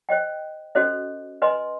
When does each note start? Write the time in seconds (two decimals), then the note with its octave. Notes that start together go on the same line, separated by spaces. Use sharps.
0.09 C5 D#5 G5
0.75 C#4 F#4 A4 C5 D#5
1.42 B4 D#5 G#5 C6